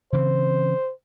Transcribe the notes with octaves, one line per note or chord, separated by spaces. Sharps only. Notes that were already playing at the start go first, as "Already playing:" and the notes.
C#3 E3 C4 C5